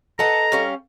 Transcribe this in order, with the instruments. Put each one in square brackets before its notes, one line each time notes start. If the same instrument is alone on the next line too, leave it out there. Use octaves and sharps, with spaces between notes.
[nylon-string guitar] A4 B4 D#5 [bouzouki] F#5 A5 [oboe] A#5
[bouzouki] G3 C#4 F5